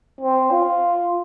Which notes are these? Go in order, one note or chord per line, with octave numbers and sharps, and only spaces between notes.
C4
F4